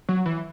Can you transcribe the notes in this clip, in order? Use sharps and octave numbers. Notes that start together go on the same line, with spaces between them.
F#3
E3